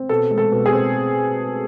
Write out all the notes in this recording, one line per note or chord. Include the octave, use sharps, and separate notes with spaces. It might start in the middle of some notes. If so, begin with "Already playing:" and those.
Already playing: C4
B2 A4
G#3
A4
B2
G#4
C4